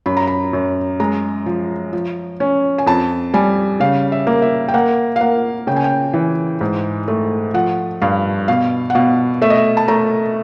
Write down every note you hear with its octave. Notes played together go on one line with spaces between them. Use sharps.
F#2 B5
A#5
B5
F#2
G#3 A#5
F3
F3
C#4
G#5
F2 A5
G3 G#5
C#3 F5
E5
A#3
E5
G5
A#3 F#5
F5
A#3 F#5
C#3 G5
G#5
G5
E3
G#2
A3
F3 F#5
G2 F5
B2 F5
F#5
B2 F5
A3 E5
D#5
E5
A5
A3 A#5